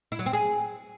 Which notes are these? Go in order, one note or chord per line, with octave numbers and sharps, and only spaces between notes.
E4
F#3
C4
G#4